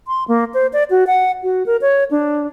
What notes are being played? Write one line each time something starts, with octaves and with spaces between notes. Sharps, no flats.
C6
A#3
C5
D5
F#4
F#5
F#4
A#4
C#5
D4